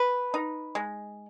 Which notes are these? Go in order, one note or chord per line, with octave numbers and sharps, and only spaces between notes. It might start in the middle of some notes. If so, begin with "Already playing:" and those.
Already playing: B4
D#4
G#3